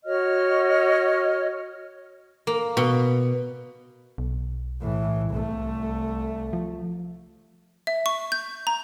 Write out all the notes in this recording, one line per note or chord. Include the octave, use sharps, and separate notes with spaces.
F#4 C#5 D#5 F6
A#3
B2
B1
A2 E3
C2 A3
F3
E5
C#6
G6
A#5